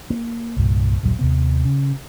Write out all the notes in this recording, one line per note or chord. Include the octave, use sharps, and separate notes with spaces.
A#3
C2 G2 A#2
D#1 A#1 G2 F#3
D#2 C3 B3
C#3